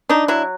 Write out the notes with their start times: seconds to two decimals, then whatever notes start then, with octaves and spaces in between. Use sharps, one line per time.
0.09 D4 D#4
0.28 F#3 E4